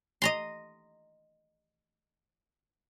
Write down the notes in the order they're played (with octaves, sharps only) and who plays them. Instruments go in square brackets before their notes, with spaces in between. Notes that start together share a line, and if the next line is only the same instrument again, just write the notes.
[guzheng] D#5 A#5 C6